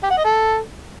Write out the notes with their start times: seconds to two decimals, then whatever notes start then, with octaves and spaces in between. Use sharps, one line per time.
0.04 G4
0.11 F#5
0.18 D#5
0.25 A4